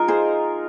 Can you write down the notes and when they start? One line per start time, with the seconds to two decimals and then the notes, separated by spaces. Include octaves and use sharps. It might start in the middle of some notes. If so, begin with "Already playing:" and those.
Already playing: G#3 D#4 F4 A#4
0.08 G#4 C5